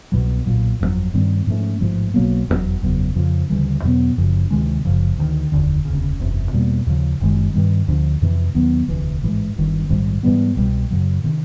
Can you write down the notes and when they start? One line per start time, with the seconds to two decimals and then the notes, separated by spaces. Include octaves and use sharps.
0.12 C2 B2 F#3
0.46 B1 A#2 F#3
0.80 G1 F2 C#3 F#3
1.13 G2 D#3 G3 C4
1.47 G#2 F3 A3 C#4
1.80 A1 G#2 F3 A3
2.14 B1 B2 F#3 A#3
2.48 F1 E2 B2 F#3
2.82 F#1 E2 C#3 F#3
3.15 F2 C#3 F3
3.50 D2 C#3 E3 G3
3.82 E2 B2 F#3 B3
4.17 F#1 F#2 C#3 F3
4.51 D2 C3 D#3 G#3
4.85 F#1 F#2 C#3 F3
5.17 D2 C3 D#3
5.52 F1 D#2 D3
5.85 E1 D2 C#3
6.19 F#1 E2 C3
6.52 E2 B2 G3 A#3
6.86 D#2 C#3 F3
7.20 F#1 F#2 D#3 G#3
7.54 G2 D#3 G3
7.88 D2 D3 F3
8.22 F2 C3 E3
8.54 D#2 D#3 F#3 B3
8.88 E1 D2 C3 E3
9.22 A1 G#2 E3 G#3
9.56 G1 G2 D#3
9.89 A#1 G#2 D#3 G3
10.23 G#2 E3 G3 B3
10.57 C2 B2 G3
10.90 F#2 C#3 F#3
11.24 C3 D#3